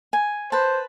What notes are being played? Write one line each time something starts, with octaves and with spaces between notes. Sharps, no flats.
G#5
B4 C5 A5